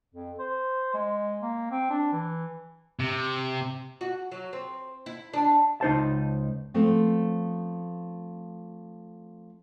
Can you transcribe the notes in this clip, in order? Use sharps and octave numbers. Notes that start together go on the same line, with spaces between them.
F2
C5
G#3
A#3
C4
D4
E3
C3
F#4
F#3
C4
E4
D4
C#2 D#4 C5 A5
F3 A3 B3 C4